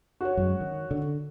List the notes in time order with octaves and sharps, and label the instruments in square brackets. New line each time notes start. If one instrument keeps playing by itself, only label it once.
[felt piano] F#4 C#5
[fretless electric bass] F#2 F#3 G#3
D#3
D3